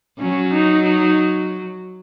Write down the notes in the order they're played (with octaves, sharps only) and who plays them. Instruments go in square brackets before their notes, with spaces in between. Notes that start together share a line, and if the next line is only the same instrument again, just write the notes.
[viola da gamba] F#3 [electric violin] C#4
[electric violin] D#4
D#4